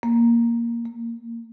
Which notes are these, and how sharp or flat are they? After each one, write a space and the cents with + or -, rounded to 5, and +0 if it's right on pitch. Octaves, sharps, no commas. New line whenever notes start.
A#3 +5
A#3 -25